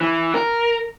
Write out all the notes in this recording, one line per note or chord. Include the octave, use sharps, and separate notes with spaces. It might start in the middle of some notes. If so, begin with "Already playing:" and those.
E3
A#4